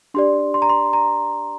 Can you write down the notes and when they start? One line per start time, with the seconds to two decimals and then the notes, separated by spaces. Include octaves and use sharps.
0.14 D4 G4 D5 C6
0.54 C6
0.62 A#5
0.69 C6
0.93 A#5